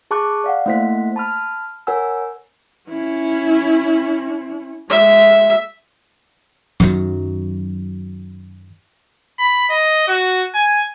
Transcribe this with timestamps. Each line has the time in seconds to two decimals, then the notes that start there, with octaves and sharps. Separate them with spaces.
0.11 G#4 A5 C#6 D6 F#6
0.44 D5 F5 F#5
0.66 A3 A#3 E4 C5 F#5 B6
1.16 A5 B5 F6
1.87 A#4 C#5 F#5 G#5 E6
2.90 C#4 E4
4.90 G#3 E5
6.80 F#2 D#3 F#3
9.39 B5
9.71 D#5
10.08 F#4
10.54 G#5